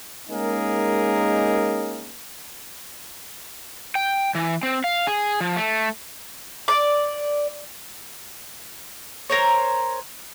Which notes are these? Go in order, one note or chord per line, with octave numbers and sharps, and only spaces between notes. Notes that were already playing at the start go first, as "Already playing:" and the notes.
G#3 A#3 C#4 D#4 G#4 A#4
G5
E3
C4
F5
G#4
F3
A3
D5
A#4 C5 C#5